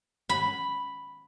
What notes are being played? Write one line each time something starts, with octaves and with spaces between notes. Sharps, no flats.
B5